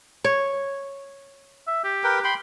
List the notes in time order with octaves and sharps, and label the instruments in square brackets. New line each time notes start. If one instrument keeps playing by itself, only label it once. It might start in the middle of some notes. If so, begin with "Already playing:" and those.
[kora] C#5
[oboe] E5
G4
[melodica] A#4 B4 G5
G5 B5 C6